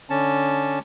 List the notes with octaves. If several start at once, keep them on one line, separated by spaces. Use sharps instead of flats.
D3 C#4 A5